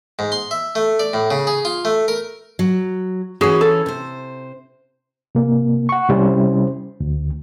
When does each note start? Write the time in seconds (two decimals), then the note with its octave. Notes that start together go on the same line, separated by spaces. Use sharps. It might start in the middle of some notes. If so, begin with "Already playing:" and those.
0.19 G#2
0.32 C6
0.51 E5
0.75 A3
1.00 D5
1.13 A2
1.31 C#3
1.47 G#4
1.65 F4
1.85 A3
2.08 A#4
2.59 F#3
3.41 E3 C#4 F#4 G#4
3.61 A4
3.86 C3 C5
5.35 C3 A#3
5.89 F#5 C#6
6.09 C3 G3 C#4 E4 C5
7.00 D2